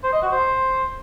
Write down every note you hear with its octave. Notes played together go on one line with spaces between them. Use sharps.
C5
D#5
F#4
C5